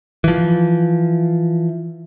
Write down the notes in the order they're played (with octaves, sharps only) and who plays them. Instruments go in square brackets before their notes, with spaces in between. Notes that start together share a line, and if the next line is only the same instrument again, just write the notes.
[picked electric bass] E3 F3